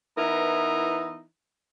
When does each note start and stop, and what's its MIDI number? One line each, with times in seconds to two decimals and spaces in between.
0.18 1.23 52
0.18 1.23 59
0.18 1.23 63
0.18 1.23 64
0.18 1.23 70